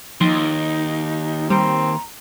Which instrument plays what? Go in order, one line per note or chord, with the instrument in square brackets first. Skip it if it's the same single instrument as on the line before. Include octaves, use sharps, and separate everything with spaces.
[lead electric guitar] D#2 [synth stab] F3 C6 [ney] D#4
[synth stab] G3 [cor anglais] C4 [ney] A#5